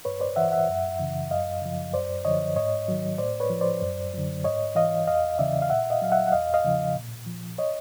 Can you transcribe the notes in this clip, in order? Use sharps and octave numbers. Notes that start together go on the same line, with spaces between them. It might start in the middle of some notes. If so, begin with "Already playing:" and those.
G2 B4 C#5
C5 D5
E3 E5 F#5
E5 F#5
F#2
C#3 E3
F#2 D#5 F5
C#3 F3
F#2 C5 D5
D3 F3 C#5 D#5
G#2 C#5 D#5
D#3 F#3
A2 C5 D5
B4 C#5
F3
C5 D5
F#2
D3 F#3
G#2 C#5 D#5
E3 D#5 F5
E2 D#5 F5
C#3 E3 D5 E5
F5
A#2 E5 F#5
D#5 F5
F#3 F5
E5 F#5
F#5
E2 D#5 F5
D#5 F5
C#3 F3
A#2
F3
C#5 D#5